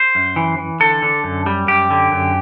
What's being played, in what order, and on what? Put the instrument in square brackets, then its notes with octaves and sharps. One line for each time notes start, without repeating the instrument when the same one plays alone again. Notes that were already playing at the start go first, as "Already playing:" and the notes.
Already playing: [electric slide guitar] C5
F#2
E3
E3
D3 A4
D3
F#2
G3
F#2 G4
D3
F#2